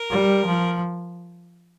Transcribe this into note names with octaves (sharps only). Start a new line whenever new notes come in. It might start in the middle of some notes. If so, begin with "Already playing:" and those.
Already playing: A#4
G3
F3